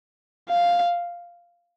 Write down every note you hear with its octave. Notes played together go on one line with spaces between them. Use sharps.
F5